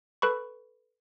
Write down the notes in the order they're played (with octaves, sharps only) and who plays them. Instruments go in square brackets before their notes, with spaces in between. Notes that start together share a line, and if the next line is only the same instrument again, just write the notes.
[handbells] A4 B4 B5 C#6